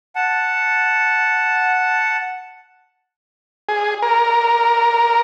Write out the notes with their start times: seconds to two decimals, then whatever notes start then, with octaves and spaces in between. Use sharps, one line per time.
0.16 F#5 A5
3.69 G#4
4.02 A#4